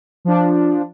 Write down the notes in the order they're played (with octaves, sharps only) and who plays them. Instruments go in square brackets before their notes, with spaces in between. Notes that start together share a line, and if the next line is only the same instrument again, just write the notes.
[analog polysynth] F3 D4